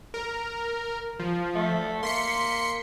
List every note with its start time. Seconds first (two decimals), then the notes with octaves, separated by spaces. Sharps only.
0.14 A#4
1.20 F3
1.55 A3
2.03 A#3 C6 B6 C#7